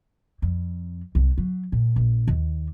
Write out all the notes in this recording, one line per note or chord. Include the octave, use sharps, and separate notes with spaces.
F2
C2
F#3
A#2
A#1
D#2